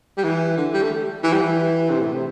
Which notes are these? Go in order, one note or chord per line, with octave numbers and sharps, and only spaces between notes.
G3
E3
D3
G3
A3
E3
G3
E3
C3
A2
C3